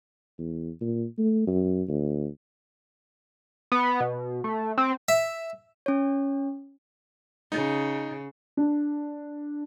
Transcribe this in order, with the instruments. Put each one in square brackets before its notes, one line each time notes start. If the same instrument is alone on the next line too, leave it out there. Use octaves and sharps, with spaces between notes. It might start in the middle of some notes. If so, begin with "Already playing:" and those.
[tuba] E2
A#2
A3
F#2
D2
[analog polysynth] B3
B2
A3
C4
[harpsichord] E5
[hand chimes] C#4 C#5
[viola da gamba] C#3 [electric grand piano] D#4
[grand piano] D4